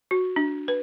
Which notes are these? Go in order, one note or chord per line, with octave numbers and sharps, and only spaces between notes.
F#4
D4
B4